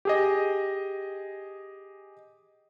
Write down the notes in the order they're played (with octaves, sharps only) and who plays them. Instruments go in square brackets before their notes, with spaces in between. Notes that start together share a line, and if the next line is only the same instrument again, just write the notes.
[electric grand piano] G4 G#4 D#5